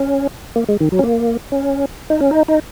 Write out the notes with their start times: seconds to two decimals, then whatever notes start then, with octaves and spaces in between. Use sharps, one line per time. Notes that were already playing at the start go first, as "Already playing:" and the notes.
Already playing: C#4
0.56 A#3
0.69 G#3
0.80 D#3
0.92 F#3
0.99 C#4
1.03 A#3
1.52 C#4
2.10 D#4
2.21 C#4
2.31 D#4
2.48 D#4